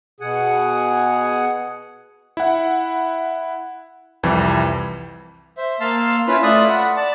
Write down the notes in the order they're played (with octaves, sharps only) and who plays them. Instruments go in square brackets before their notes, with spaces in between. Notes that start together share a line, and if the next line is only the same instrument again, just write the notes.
[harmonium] B2 G#4 F#5 G#5
[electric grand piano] E4 F#5
C2 F2 E3
[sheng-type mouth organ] C5 E5
A#3 F5 A5 C6 E6
C#4 E4 F4 B4
A3 F4 D5 E5 D#6 F#6
F#5 B5
D5 A5